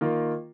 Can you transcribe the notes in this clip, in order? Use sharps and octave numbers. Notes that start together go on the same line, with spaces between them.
D#3 A#3 F4